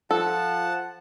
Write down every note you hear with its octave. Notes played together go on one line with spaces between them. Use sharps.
F3 A4 F#5 A5